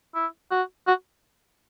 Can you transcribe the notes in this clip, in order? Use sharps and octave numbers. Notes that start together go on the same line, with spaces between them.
E4
F#4
F#4